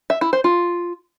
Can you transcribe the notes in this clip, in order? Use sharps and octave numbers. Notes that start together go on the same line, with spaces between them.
E5
E4
C5
F4